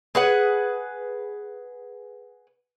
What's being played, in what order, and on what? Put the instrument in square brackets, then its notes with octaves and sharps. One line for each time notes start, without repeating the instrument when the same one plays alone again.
[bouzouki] G#4 B4 F#5